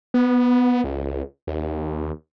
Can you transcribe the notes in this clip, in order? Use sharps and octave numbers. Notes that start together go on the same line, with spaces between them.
B3
C#2
D#2